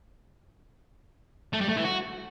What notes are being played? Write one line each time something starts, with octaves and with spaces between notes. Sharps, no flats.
A3
G3
A3
E3
F#4